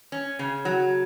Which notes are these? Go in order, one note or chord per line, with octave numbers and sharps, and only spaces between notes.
C#4
C#3
F#3